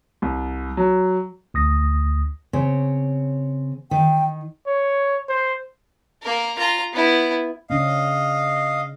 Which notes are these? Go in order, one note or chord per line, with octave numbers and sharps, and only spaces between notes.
C2
F#3
D2 D#6 A#6
C#3 C4 C#5
D#3 G5
C#5
C5
A#3 A#4
F4 A#5
B3 E4
C#3 C#4 D4 D#5 F5